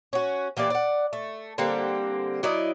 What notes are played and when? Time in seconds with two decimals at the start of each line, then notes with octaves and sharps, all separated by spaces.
0.13 C#4 F#4
0.57 E3 A#3 G4 D5
0.70 D5 F#5
1.13 A3
1.58 D3 G3 A#3 C4
2.43 F#3 E4 D5 D#5